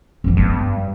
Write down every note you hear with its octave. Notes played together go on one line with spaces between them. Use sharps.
F#2 E3
G2 G3 B3